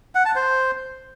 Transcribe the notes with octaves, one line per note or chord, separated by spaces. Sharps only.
F#5
A5
C5